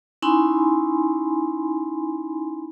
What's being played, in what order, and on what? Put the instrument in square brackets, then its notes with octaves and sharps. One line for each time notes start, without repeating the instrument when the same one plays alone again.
[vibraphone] C#4 D#4 E4 G#5 B5 C6